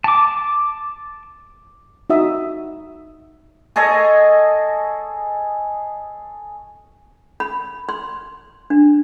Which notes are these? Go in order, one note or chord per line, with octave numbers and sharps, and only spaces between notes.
A5 D6
D#4 F#4 E5 D#6
G#4 A4 C#5 D#5
B5
C6
D4